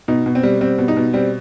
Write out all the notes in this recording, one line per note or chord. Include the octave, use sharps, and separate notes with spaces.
B2 D#4
B2
C4
G3
G3 C4
B2
D#4
B2
G3 C4